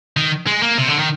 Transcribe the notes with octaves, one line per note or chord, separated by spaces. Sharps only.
D#3
G#3
A#3
C3
D3
D#3